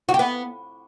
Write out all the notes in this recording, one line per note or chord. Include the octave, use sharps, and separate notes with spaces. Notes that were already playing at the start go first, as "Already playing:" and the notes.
F#4
G4
B3